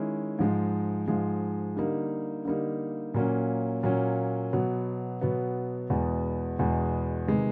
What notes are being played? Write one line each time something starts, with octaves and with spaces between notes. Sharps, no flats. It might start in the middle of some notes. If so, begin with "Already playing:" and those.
Already playing: D#3 G#3 C#4 E4
G#2 F3 G#3
G#2 F3 G#3
D3 G3 A#3 D#4
D3 G3 A#3 D#4
A#2 F#3 A#3 C#4
A#2 F#3 A#3 C#4
B2 F#3 B3
B2 F#3 B3
E2 B2 G#3 B3
E2 B2 G#3 B3
C3 D#3 G#3 B3